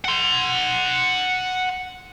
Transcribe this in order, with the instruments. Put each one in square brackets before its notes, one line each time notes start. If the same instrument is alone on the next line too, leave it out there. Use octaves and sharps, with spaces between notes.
[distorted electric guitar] F#5 C6